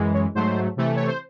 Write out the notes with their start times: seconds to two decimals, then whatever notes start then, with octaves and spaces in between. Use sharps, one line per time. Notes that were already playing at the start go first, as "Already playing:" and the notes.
Already playing: F#2 E3 G#3
0.14 C#5
0.35 G#2 F#3 A3 C5
0.77 C3 E3 A3
0.96 C#5
1.07 C5